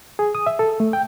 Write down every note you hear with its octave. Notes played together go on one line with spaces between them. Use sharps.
G#4
D#6
E5
A4
A3
G5